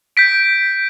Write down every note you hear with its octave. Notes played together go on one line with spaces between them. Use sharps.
G6 B6 D7